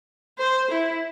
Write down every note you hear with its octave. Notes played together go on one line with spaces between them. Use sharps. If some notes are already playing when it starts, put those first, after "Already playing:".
C5
E4